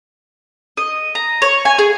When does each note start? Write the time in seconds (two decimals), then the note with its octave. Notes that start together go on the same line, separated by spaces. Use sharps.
0.77 D#5
1.15 A#5
1.42 C#5
1.65 G#5
1.79 G#4